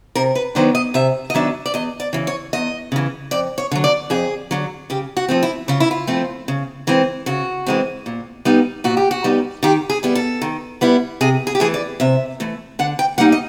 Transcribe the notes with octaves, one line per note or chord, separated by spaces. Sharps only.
C3 A#4
B4
D#3 F#3 B3 D4 C5
D#5
C3 E5
D#5
D#3 F#3 B3 D4 E5
D5
E2 D#5
D5
C#3 E3
C#5
E2 D#5
C#3 E3
F2 D5
C#5
D3 F#3
D5
F2 G#4
D3 F#3
C#3 G4
F#4
F3 A3 C4
E4
C#3 F4
E4
F4
F3 A3 C4
C#3
E3 G#3 C4
C#3 F#4
E3 G#3 C4
A#2
G3 B3 D#4
A#2 F#4
G4
F#4
G3 B3 D#4
D#3 G4
G#4
G3 B3 E4
A4
D#3
G3 B3 E4
C3 G#4
G#4
G4
E3 A3 G#4
D5
C3 E5
E3 A3
D3 F#5
G5
G3 A#3 D#4 F#5
D#5